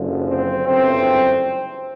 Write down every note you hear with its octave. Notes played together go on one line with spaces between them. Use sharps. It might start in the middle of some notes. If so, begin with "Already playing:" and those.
Already playing: F#1 F#2 D3 F3
C4
G1 F#2 C#3 E3 A3 C4